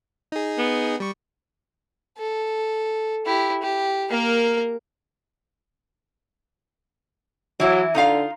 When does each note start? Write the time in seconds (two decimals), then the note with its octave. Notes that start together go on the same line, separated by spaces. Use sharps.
0.32 D#4 G#4
0.58 B3
1.00 G3 C#6
2.18 A4
3.26 E4 G4
3.62 G4
4.10 A#3 A#4
7.60 E3 F#3 E4
7.95 D3 D#4 F4 F5